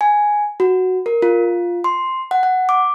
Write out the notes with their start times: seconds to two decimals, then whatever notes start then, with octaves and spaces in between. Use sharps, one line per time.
0.01 G#5
0.60 F#4
1.06 A#4
1.22 F4
1.84 C6
2.31 F#5
2.43 F#5
2.69 D6